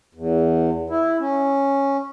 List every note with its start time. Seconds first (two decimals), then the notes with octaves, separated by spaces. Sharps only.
0.15 E2
0.90 E4
1.20 C#4